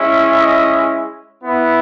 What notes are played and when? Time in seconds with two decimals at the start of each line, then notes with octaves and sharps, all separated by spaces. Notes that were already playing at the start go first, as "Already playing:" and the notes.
Already playing: G#3 C#4 E4
0.39 D#5
1.43 B3 E4